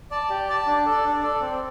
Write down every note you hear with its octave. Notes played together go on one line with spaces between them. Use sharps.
D5 A5
G4
D5 A5
D4
A4 D5
D4
A4 D5
C4